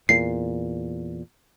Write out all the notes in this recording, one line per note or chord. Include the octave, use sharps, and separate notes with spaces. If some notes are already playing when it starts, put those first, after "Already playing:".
E2 A#2 C7